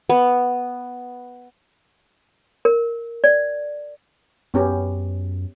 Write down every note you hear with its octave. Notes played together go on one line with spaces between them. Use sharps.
B3
A#4
D5
F#2 B3 C#4 G4